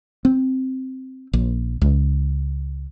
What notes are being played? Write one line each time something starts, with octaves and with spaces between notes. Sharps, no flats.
C4
A#1
C#2